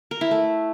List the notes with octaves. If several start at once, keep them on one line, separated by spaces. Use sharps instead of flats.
A#4
E4
A3